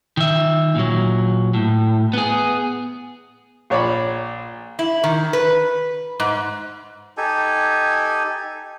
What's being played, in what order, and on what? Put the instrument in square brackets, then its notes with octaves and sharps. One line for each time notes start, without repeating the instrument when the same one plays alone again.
[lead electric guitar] D#3 E5
A#2 F#3
A2
B3 G#4
[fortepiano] A#1 C#5 D5 B5
[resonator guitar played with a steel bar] E4
D#3
B4
G#2
[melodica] D#4 G4 A4 G#5